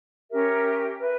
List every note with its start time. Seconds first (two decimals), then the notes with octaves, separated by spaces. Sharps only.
0.30 C#4 G4 A#4 E5
1.00 B4 E5